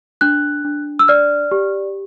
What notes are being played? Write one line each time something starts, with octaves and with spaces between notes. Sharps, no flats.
D4 F#6
D4
E6
D5 F6
G4